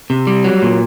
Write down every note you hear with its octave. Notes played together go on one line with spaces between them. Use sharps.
C3
G3
F#3
A#2